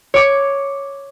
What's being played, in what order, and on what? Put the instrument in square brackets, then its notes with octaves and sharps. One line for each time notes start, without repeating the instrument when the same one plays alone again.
[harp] C#5 D6 C#7